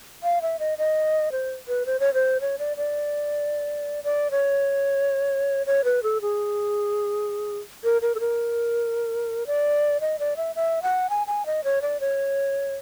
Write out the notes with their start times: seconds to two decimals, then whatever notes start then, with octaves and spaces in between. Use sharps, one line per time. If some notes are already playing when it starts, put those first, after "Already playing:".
0.23 F5
0.42 E5
0.59 D#5
0.78 D#5
1.32 C5
1.68 B4
1.86 C5
2.00 C#5
2.14 C5
2.41 C#5
2.59 D5
2.77 D5
4.04 D5
4.31 C#5
5.66 C#5
5.84 B4
6.03 A4
6.21 G#4
7.84 A#4
8.02 A#4
8.15 A4
8.20 A#4
9.47 D5
10.01 D#5
10.19 D5
10.37 E5
10.56 E5
10.82 F#5
11.10 G#5
11.27 G#5
11.46 D#5
11.64 C#5
11.82 D5
12.00 C#5